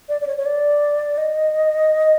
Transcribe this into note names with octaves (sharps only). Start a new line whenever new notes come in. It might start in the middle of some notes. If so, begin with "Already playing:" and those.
D5
D5
C#5
C#5
D5
D#5